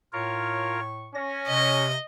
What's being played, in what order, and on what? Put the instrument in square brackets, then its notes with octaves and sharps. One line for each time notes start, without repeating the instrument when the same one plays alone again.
[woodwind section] A2 C#6 [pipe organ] F4 A#4 C#5
[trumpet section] C#4 [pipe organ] A#6
[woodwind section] C3 [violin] D#5